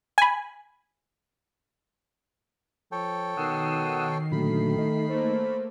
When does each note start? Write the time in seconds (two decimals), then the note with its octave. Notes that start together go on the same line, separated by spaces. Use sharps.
0.18 G#5 B5
2.92 F3 A4 C#5 G5
3.37 B2 D#3 F#5 D#6 E6 C7
4.32 A#2 D3 F#3 A3 B5
4.78 D#4
5.10 A3 A#3 C5